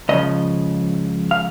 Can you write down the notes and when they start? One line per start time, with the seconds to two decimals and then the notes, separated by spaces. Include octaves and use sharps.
0.09 C#2 C#3 F3 D#5
1.31 F5